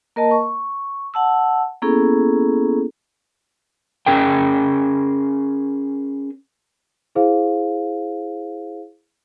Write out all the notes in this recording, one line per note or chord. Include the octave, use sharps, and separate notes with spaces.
A#3 A#4 D#5 A5
C#6
F#5 A5 E6
A#3 B3 C#4 E4 G#4 A4
C#4 G#4 A#4 G5
E4 G#4 C5 F5